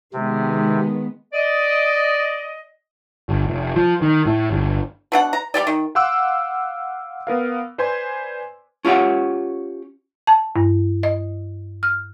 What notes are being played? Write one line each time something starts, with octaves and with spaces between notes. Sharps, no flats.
C3 D#3 G#3 B3
D5 D#5
G1
F1
F3
D#3
A2
G1
B2 D4 F#5
A#5
G3 A#3 G4 D5
D#3
F5 F#5 C6 D6 E6 F#6
B3 A#4 F5
B4 C5 D5 G#5 C6
C#4 F4 G4 C#5 F#5
A5
G2
D#5
F6